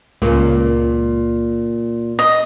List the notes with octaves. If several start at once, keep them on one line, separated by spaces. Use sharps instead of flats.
C#2 A#2
D#5